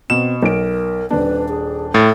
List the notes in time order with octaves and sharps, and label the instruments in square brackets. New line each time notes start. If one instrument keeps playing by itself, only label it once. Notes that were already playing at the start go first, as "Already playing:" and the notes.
[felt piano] B2 [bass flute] C4 [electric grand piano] E7
[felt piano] B1 D7 [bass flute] A#4
[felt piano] D#1 D4 [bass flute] B4
[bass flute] G#4
[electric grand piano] A2 [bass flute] A4 [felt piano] A6